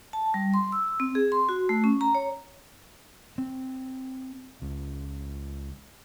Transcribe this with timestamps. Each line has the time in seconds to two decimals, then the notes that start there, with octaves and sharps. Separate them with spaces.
0.13 A5
0.34 G3
0.54 C6
0.72 E6
1.00 C4
1.15 G#4
1.32 C6
1.49 F#4
1.69 A3
1.84 C#4
2.01 A#5
2.15 C#5
3.38 C4
4.62 C#2